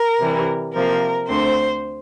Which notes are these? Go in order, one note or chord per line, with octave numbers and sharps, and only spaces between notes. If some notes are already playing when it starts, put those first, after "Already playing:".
Already playing: A#4
C3 E3 G3
C3 F3 A#3 A#4
D2 D3 A3 C4 C5